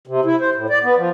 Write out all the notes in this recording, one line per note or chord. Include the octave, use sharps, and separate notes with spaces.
C3
E4
C5
A2
D5
B3
F3